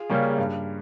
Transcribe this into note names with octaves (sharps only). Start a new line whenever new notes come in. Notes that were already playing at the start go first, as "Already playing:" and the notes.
Already playing: F4 G#4
C#3 G3 A#3 C#4
G2